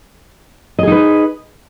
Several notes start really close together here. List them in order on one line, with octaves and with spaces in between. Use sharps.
D#5 G#4 D#4 B4